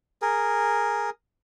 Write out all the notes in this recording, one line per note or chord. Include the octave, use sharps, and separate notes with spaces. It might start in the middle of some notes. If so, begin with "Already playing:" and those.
G#4 A#4